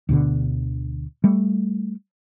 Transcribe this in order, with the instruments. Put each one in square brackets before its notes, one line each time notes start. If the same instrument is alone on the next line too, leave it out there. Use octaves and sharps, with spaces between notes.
[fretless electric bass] D2 B2 D3
G3 A3